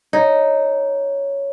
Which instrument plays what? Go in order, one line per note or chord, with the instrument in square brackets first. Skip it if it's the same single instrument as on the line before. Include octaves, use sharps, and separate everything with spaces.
[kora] D#4 [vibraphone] C#5